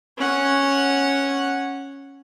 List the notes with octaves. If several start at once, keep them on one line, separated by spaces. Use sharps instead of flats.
C#4 F#5